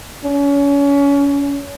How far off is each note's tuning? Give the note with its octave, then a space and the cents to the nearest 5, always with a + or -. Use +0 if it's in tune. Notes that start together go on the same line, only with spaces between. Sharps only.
C#4 +30